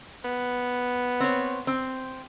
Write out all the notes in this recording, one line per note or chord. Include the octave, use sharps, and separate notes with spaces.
B3
C4 C#5
C4